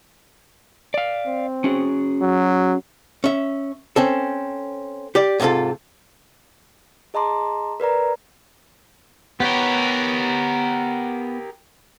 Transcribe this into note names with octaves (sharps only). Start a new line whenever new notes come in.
D5 F5
C4
C#4 F#4 G#4
F#3
C#4 E5
C4 C#4 A4
G4 D5
G#2 C3 D#4 F4 A4
G#4 D#5 A5 A#5 C6 D6
A#4 B4 D5 A#5
B3 G4 A#4 B4 C#5